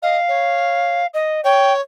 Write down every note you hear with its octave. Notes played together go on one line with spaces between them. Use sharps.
D#5 F5
C#5
D#5
C#5 G5